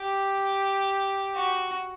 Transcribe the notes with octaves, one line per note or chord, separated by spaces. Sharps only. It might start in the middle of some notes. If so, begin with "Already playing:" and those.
Already playing: G4
F#4